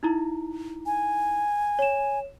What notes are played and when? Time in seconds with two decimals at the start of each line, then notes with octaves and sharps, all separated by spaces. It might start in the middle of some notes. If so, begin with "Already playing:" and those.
0.03 D#4 E4 A#5
0.86 G#5
1.79 C#5 E7